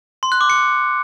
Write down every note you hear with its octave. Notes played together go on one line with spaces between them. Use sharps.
C6
F#6
D6
C#7